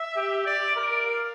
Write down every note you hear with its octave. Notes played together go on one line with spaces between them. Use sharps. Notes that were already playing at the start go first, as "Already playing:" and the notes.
Already playing: E5
G4
D5
A#4
F5